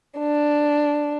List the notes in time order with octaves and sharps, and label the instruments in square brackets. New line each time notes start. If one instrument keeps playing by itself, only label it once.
[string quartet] D4